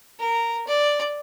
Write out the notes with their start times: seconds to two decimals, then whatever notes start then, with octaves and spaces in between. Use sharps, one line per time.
0.19 A#4
0.67 D5